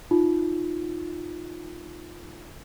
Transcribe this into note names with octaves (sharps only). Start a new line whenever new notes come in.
D#4 F4